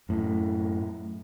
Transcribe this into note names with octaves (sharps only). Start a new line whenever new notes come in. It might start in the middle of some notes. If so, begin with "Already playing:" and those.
F#2 A2